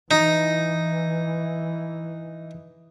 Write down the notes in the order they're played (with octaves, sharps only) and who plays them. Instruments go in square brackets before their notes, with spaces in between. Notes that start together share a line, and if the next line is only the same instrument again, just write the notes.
[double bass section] E3 [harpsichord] D#4